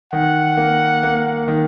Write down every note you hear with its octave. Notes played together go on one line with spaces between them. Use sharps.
D#3 F#5
A#3
A#3
D#3